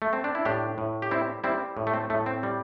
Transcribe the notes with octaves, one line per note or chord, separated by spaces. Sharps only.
A3
C4
D4
E4
A2 D4 G4
A2
G4
G3 C4 E4
G3 C4 E4
A2
A3
C4
A2 A3
C4
G3